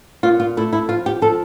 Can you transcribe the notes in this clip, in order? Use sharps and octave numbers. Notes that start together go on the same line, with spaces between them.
A#2 F4
F4
A3 E4
E4
F3 F4
G4
F3 A4